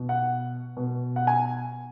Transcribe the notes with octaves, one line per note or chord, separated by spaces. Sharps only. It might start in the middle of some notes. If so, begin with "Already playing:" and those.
Already playing: B2
F#5
B2
F#5
G#5